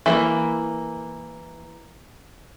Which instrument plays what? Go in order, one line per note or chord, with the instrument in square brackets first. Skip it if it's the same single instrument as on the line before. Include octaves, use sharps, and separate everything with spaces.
[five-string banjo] E3 A3 A#3